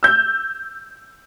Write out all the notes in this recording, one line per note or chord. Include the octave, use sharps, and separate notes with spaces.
E6 G6